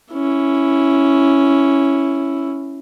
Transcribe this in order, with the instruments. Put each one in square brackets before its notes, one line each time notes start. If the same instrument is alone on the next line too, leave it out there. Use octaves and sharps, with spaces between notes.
[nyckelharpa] C#4 E4